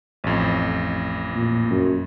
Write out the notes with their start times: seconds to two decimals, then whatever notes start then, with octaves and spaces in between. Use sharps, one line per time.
0.24 A1 F2
1.33 A#2
1.71 F#2